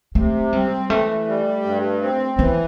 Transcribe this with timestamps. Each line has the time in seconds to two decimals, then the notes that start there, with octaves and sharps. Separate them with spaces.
0.15 C3 A3
0.53 G3 C4
0.90 E3 A3
1.27 G3
1.65 G2
2.02 C4
2.39 E3 B3